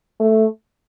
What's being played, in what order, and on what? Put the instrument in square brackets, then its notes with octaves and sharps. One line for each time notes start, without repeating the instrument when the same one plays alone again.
[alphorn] A3